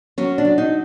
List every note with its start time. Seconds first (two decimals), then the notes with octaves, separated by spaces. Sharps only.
0.18 F#3 C#4
0.38 D4
0.45 F#3
0.58 D#4